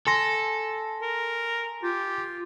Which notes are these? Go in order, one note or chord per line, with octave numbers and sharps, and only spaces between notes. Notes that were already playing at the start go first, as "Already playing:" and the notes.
A4 G#5 C6 A#6
A#4
F4 G4